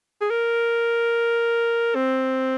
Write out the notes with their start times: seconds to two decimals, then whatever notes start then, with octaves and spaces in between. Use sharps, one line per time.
0.21 G#4
0.30 A#4
1.95 C4